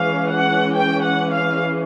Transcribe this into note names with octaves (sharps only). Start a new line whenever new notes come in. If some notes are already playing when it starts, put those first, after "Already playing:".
Already playing: E3 G#3 C#4 F5
F#5
G5
F#5
F5